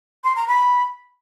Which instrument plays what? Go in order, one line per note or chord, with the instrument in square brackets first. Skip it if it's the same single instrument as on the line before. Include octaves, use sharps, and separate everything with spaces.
[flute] C6
A#5
B5